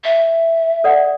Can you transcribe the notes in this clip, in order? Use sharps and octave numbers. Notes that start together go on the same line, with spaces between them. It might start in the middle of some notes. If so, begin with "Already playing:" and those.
E5
A4 D5 F#5